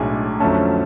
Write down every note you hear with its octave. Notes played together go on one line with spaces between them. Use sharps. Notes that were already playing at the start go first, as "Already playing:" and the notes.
Already playing: B1 A2 G#3 D4 G#5
F2 D3 F#3 A3 C#4 A5